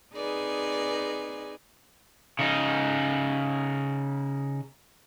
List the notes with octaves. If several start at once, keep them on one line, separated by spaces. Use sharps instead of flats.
C4 D#4 G#4 B4 D5 G#5
C#3 D#4